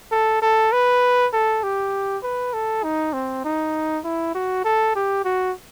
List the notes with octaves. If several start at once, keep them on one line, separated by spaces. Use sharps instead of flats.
A4
A4
B4
A4
G4
B4
A4
D#4
C4
D#4
E4
F#4
A4
G4
F#4